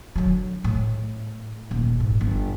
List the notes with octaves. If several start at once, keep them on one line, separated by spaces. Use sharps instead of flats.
D3 F#3
A2
D#1
G#2
G1